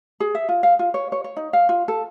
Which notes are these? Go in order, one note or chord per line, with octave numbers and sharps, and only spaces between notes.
G#4
E5
F4
F5
F4
C#5
C#5
C#5
D#4
F5
F4
A4